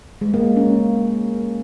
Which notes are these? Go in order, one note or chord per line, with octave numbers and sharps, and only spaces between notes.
G#3
A#3
C#4